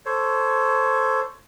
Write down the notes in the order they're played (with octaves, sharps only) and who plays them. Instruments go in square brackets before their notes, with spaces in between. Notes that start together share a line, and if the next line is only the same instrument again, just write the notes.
[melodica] A4 C5 C#5